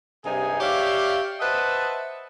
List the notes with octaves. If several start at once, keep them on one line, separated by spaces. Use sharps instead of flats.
G2 C3 D#4 G#4 G#5
G4 C#5 D5 E5 F5
B4 C5 D#5 E5 F#5 A5